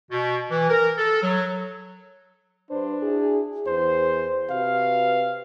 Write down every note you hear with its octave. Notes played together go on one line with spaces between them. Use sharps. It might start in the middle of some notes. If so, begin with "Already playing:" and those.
B2
E3
A#4
A4
F#3
G2 D4 B4 C5
E4 F#4 G#4
E2 C5
C3 F#4 B4 F5